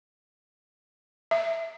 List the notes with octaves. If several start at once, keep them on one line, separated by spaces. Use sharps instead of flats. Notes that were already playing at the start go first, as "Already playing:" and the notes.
E5